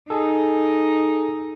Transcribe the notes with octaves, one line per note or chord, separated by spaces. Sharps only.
D#4 G#4 A4